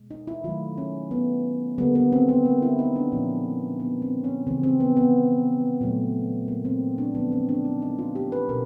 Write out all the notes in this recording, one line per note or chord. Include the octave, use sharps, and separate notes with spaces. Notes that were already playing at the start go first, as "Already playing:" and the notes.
Already playing: B2 G#3
D#4
E4
D#3 F#3 A3 F4
C#4
B3
D3 G3 A#3 B3
B3
C4
B3
A#3
E4
D#4
D4
A#2 F3 G#3 C#4
B3
C4
C#4
C#3 E3 G3 C4
C4
B3
B3
A#2 F#3 A3
A#3
C4
D4
D3 F3 G#3 B3
C4
D4
D#4
D#4
F4
G4
B4
B2 A#4